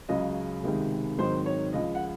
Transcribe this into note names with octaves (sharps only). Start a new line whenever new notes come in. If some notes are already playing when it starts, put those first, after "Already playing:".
C#2 C#3 F#3 D#5
C#2 C3 D#3 G#3
G#2 D#3 F#3 C4 D#4 C5
C#5
C#2 C#3 F3 D#5
F#5